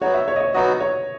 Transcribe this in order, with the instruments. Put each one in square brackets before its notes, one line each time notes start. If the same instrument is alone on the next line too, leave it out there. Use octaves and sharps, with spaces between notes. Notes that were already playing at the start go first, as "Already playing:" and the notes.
[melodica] F#3 B3 D#4 F#4 [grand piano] C#5
[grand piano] E5
C#5
D#5
C#5
[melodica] F#3 B3 D#4 F#4 [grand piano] D#5
[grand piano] C#5